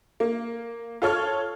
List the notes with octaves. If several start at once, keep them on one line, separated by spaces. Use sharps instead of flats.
A#3
F4 A4 C#5 F6